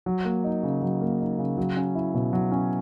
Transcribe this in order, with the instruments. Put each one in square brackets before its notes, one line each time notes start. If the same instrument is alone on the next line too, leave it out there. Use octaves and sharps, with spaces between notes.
[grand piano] F#3
A#3
D#4
C#3
F#3
A#3
D#4
C#3
F#3
C#4
E4
B2
F#3
C#4